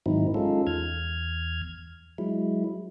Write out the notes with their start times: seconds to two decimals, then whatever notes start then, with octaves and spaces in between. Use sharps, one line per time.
0.06 G#2 D#3 F#3 C4 D#4 E4
0.34 G#3 C#4 D#4 F4 A4
0.67 E2 F6 G#6
2.18 F#3 G#3 E4